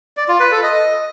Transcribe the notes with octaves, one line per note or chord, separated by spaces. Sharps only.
D5
F4
B4
A4
D#5